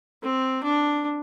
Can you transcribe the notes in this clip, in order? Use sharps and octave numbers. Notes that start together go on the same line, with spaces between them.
C4
D4